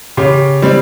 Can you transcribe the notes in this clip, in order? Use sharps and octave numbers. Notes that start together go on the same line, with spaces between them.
C#3 G4
G3 C4